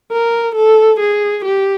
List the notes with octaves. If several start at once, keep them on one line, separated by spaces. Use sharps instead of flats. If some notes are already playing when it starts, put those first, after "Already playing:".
A#4
A4
G#4
G4